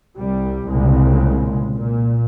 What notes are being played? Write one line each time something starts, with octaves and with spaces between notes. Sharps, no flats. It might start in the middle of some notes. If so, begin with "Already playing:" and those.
C2 G3
C2 A#2 C#3 G#3
A#2